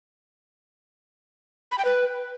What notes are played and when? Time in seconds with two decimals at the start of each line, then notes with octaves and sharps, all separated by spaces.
1.72 B5
1.78 G5
1.85 B4